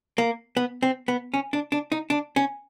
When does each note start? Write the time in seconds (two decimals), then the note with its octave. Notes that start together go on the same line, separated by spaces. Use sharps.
0.18 A#3
0.57 B3
0.83 C4
1.08 B3
1.34 C#4
1.53 D4
1.72 D4
1.92 D#4
2.10 D4
2.36 C#4